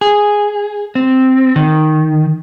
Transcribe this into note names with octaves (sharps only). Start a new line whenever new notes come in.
G#4
C4
D#3